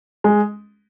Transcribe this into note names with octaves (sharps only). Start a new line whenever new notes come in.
G#3